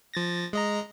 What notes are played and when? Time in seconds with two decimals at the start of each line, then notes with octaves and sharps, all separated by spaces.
0.14 F3 A6 A#6
0.53 G#3 D#5 A#5